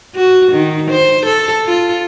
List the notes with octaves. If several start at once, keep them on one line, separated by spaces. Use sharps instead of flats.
F#4
D#3
C5
A4
F4